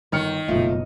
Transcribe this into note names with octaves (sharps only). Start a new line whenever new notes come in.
G1 D#3 F6 C#7
F#1 B2 F3 A3 F4